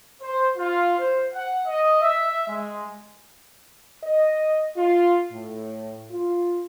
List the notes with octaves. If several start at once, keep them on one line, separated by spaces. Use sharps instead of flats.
C5
F4
C5
F#5
D#5
E5
G#3
D#5
F4
A2
F4